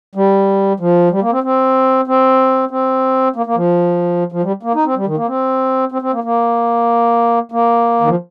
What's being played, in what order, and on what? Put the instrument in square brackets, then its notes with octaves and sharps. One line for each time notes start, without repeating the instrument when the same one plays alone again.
[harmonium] G3
F3
G3
A#3
C4
C4
C4
C4
A#3
A#3
F3
F3
G3
A#3
D#4
C4
G3
D#3
A#3
C4
C4
C4
A#3
A#3
A#3
D#3
F3